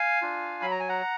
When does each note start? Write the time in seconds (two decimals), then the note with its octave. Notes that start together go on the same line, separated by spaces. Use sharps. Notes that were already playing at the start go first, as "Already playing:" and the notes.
Already playing: F5 G#5
0.22 D4 F4
0.62 F#3 B5
0.71 A#5
0.80 G#5
0.89 F#5 A#5